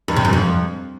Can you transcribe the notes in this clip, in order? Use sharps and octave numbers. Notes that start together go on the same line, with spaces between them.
E2
C3
F#2
F2